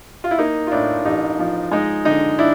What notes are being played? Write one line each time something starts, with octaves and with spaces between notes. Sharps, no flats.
F4
E4
A#3 D#4
F4
A2 D4 E4
A1 D#4
F3
G#3 D#4
D3 D#4
D4 E4